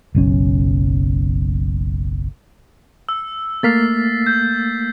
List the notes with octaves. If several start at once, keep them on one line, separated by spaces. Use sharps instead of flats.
F#1 B1 C#4
E6
A3 A#3 F6 A6 B6 C7
G6